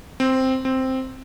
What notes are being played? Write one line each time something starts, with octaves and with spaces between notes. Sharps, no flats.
C4
C4